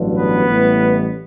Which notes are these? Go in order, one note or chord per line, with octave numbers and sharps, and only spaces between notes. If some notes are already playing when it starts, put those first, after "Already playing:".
Already playing: A1 G2 D3 F#3
B3 B4
A1 A2 G3